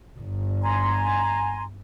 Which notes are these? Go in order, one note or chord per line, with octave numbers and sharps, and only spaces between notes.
G1
G#5 A#5 C6